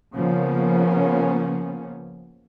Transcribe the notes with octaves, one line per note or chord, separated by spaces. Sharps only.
C#3 F3 A#3 B3 C#4